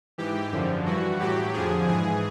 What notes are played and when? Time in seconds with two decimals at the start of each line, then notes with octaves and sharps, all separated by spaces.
0.18 G#2 E3 G4
0.52 F#2 D3 F3
0.86 G2 E3 F#4
1.19 A2 F#3 G4
1.53 F2 D3 F3 G#4
1.87 G#2 E3 G#4